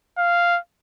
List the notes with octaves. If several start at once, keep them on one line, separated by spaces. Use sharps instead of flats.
F5